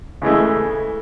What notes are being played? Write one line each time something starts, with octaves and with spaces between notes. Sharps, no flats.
C#3 E3 G#3 A3